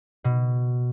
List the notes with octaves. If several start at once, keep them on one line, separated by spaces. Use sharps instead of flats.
B2